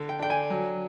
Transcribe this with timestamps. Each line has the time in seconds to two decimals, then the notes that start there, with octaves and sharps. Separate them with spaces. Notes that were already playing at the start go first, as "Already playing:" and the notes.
Already playing: D3
0.09 G5
0.19 D4 G5
0.30 G#5
0.50 F#3